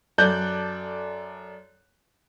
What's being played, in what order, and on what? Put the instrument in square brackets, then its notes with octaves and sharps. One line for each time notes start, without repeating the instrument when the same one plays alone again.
[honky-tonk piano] F#2 A4 D5 F#6 G6